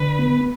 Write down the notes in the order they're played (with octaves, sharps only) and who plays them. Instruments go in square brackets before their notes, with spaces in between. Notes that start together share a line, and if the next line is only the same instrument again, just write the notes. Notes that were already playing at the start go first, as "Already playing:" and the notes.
Already playing: [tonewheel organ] D3 [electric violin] B4
[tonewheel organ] B3